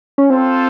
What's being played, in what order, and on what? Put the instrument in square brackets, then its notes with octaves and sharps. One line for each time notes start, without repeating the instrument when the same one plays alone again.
[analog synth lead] C#4
[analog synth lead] C4 [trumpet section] F4 A4 C5